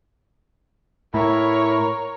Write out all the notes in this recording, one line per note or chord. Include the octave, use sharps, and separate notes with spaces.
A2 E4 A#4 C#5